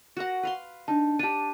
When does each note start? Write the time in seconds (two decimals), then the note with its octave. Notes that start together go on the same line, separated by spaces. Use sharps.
0.17 F#4 A#4 F#5
0.43 B4 F5 C6
0.88 D4 D#4 A5
1.19 D4 G4 A5 D#7